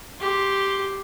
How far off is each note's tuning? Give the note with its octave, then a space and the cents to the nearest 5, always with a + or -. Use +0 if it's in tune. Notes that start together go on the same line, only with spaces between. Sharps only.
G4 +0 C6 +0